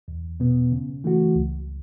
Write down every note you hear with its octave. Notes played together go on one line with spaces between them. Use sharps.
E2
B2 B3
C#3
E3 A3 F#4
C#2